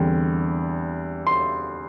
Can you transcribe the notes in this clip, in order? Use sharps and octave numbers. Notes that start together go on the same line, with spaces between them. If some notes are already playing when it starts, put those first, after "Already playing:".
Already playing: E2 D3 G3 C4
C6